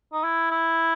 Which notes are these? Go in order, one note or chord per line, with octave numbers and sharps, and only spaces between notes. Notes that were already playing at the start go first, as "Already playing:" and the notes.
D#4
E4
E4